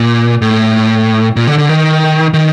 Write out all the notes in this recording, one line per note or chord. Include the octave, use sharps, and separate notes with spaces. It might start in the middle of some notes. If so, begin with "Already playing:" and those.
Already playing: A#2
A2
A#2
D3
D3
D#3
D#3